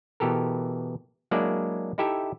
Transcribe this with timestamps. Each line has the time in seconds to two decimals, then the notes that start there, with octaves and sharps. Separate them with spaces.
0.20 B2 E3 G4 A4 A#4
1.31 F#3 G#3 A#3 D4 E4 D5
1.98 D#4 E4 G4 A4 E5